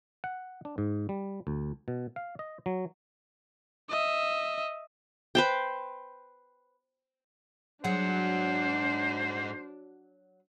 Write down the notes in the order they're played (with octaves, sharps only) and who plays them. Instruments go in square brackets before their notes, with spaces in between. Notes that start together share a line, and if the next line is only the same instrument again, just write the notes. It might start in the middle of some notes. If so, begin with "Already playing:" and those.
[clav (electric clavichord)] F#5
D4
G#2
G3
D2
B2
F5
D#5
F#3
[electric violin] D#5 E5
[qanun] B4 C5 G5
[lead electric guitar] G#2 F#5 [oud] F#3 G#4 [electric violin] D4 [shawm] C5